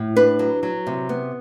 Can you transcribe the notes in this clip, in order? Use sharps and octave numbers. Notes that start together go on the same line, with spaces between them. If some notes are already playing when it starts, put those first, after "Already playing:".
Already playing: A2
D4 B4
F#3
F#3
C3
B3